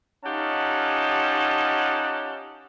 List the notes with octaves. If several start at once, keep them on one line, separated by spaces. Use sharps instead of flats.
C#4 D#4 F4 G4 F#5 A5